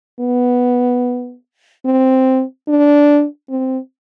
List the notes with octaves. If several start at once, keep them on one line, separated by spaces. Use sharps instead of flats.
B3
C4
D4
C4